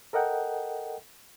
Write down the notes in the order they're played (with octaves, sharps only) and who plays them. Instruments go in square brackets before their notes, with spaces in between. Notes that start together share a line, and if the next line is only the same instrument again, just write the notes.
[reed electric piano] A4 A#4 D#5 F#5 G5